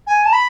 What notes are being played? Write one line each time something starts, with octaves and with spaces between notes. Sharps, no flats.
G#5
A5
B5